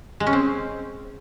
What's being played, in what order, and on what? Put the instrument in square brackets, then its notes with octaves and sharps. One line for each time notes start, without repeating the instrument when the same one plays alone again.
[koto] G#3
C#4
C4